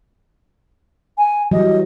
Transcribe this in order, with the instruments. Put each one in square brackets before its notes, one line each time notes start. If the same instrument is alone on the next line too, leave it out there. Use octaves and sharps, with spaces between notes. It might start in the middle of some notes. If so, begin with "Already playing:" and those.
[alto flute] G#5
[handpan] E3 F#3 G3 [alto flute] D#5